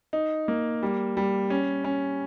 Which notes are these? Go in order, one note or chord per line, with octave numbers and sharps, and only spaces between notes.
D#4
A#3
G3
G3
C#4
C#4